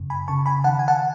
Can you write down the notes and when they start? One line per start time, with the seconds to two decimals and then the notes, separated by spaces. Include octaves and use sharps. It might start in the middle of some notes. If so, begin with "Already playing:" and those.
Already playing: F#2 C#3
0.10 G#5 B5
0.28 C#3 A5 C#6
0.46 G#5 B5
0.64 D#3 F#5 A5
0.79 G#5
0.88 F#5 A5